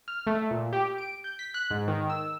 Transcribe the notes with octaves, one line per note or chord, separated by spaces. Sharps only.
F6
A3
A#2
G4
D7
G6
B6
F#6
G#2
D#3
E6